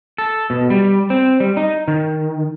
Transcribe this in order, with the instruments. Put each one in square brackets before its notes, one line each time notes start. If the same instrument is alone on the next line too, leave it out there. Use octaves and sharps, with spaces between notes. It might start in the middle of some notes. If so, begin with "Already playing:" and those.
[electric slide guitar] A4
B2
G3
C4
G3
D#4
D#3